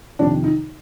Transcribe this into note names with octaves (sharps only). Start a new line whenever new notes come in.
F2 C3 D#3 D4
D#4